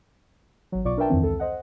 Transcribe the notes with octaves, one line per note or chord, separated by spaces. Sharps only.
G#1 F#3
B1 B2 F4 D5 C#6 D6
D4 A#4 B4 E5 G5 A5
F2 G#2 D#3 E3 C4
C#2 A4
C5 D#5 F#5